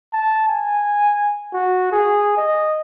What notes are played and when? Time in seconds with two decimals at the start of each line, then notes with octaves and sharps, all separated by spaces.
0.14 A5
0.49 G#5
1.53 F#4
1.92 G#4
2.37 D#5